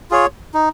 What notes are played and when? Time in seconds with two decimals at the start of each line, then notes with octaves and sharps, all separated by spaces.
0.11 F4 G#4 C#5
0.54 D#4